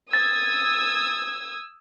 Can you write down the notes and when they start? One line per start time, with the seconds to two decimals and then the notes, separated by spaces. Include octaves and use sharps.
0.13 D#6 E6 G#6 A6